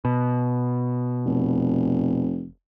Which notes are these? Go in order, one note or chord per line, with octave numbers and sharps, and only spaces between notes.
B2
F1